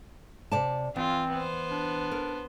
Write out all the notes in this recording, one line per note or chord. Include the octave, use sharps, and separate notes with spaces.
C3 D5 A5
E3 C4 F4
B3 C5
D4
A#4